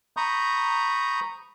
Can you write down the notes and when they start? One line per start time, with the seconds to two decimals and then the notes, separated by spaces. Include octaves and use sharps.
0.17 A#5 B5 C#6 D#6 G6